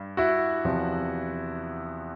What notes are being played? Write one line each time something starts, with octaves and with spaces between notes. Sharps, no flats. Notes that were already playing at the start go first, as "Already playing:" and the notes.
Already playing: G2
E4 F#4
E2 C3 F3